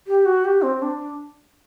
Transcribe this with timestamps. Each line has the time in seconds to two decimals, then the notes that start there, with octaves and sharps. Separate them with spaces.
0.07 G4
0.25 F#4
0.45 G4
0.62 C4
0.82 D4